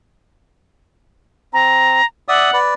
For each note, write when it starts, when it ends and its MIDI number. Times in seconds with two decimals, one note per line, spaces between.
1.53 2.01 60
1.53 2.05 82
2.28 2.51 74
2.28 2.51 76
2.28 2.58 78
2.28 2.51 87
2.53 2.74 71
2.53 2.74 74